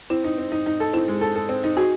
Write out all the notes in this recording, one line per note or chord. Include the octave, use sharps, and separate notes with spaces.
C4 E4
D#4
C4
D#4
D#4
A4
C4 E4
G#3
A4
A4
C4
D#4
F#4 G#4